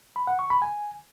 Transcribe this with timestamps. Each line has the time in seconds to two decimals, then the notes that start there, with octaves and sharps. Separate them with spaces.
0.16 B5
0.27 F#5
0.39 C#6
0.50 B5
0.62 G#5